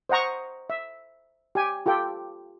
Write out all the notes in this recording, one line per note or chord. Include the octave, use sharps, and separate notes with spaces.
C5 D#5 F#5 A#5 C#6
E5
G4 G#5
F4 G4 A4 G5